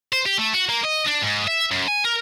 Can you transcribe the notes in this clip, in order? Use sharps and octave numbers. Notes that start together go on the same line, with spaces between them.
C5
G4
A3
F#4
A#3
D#5
D4
G#2
E5
F#2
G#5
A#4